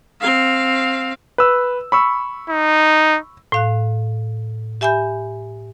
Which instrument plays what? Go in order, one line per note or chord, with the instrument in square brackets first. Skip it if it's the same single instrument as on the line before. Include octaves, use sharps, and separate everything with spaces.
[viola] C4 F5
[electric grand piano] B4 E6
B5 C#6 E6
[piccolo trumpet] D#4
[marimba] A2 F5 F#6
G4 E5 G#5 B5 G6